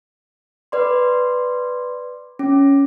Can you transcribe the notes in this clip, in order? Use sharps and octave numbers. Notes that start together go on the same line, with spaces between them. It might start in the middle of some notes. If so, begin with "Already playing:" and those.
B4 D5 C6
C#4